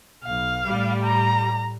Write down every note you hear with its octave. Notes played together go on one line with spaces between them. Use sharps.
B1 F5
A2 G3
A#5